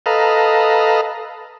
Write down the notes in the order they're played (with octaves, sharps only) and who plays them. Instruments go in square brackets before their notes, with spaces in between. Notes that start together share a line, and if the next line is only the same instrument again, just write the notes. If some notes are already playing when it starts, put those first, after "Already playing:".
[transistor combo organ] A4 B4 D#5 F5 A#5